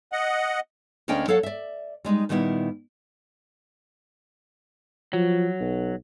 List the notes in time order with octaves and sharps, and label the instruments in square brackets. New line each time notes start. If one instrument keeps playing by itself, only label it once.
[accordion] D#5 F#5
[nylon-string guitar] D2 A#3 C#4 D4 D#5 G5
F#3 A4 C#5 F5 F#5
D5 E5
G3 G#3 D4 D#4
A#2 D#3 G3 B3 E4
[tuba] F3 [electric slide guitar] F#3
[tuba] B1